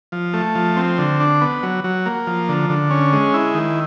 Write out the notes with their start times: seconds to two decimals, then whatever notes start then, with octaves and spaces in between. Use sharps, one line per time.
0.12 F3
0.34 A3
0.55 F3
0.77 C4
0.98 D3
1.20 D4
1.41 B3
1.63 F#3
1.84 F#3
2.06 A#3
2.27 F3
2.49 D3
2.70 D3
2.91 C#4
3.13 G#3
3.34 E4
3.55 D#3